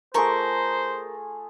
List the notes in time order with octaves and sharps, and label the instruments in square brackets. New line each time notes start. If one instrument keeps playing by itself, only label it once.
[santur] A3 F4 G#4 [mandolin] A#4 C#6 [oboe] C5